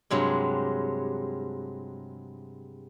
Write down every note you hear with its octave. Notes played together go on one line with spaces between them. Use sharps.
G2 C3 F#3 G#3